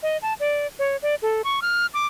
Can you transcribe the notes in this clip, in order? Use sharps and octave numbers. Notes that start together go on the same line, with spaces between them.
D#5
A5
D5
C#5
D5
A4
C#6
F6
D6